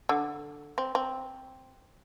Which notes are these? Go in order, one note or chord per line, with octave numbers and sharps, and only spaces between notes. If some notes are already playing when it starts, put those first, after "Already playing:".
D3
C4
C4